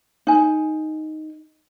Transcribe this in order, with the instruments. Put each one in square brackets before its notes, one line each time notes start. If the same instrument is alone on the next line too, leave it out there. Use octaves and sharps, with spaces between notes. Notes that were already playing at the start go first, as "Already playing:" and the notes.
[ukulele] D#4 G#5